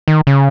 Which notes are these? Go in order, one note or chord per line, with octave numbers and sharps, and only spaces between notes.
D#3
C#3